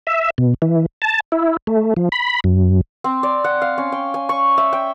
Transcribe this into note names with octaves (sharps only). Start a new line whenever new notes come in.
E5
B2
E3
A5
E4
A3
F3
B5
F#2
C4
D5
F#5
F5
C#4
G5
G#5
C#6
E5
G5